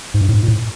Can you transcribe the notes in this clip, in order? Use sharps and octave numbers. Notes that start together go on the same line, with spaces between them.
G#2
G2
A2
G#2
A#2
A2